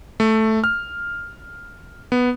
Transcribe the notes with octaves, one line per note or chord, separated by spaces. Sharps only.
A3
F6
B3